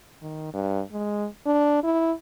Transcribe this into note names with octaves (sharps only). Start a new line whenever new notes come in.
D#3
G2
G#3
D4
E4